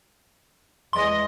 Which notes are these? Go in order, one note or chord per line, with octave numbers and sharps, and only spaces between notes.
E2 G#3 D#5 C6